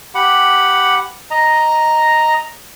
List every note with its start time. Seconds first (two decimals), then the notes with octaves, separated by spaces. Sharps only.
0.15 G4 F#5 B5
1.31 D#5 A#5